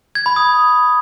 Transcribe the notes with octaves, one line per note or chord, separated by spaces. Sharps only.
G#6
B5
D#6